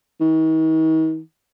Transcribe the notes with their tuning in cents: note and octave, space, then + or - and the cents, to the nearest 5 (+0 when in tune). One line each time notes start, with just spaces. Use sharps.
D#3 +45